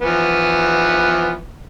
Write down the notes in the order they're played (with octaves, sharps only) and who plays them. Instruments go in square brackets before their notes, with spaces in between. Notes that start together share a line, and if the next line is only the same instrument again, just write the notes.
[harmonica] E3 F3 B3